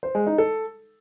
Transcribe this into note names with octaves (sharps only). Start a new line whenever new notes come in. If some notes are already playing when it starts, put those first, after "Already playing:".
C5
G#3
D#4
A4